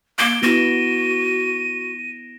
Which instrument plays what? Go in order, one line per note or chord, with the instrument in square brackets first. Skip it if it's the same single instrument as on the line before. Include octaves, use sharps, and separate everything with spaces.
[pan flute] A#3 [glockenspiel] D7 G7
[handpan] B3 E4 [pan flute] F#4 [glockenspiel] A#6 E7 [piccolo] D#7